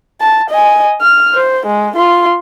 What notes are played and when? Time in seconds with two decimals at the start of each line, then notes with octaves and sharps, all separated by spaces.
0.21 A5
0.50 D#5 G#5
1.02 F6
1.34 C5
1.66 G#3
1.96 F4 C6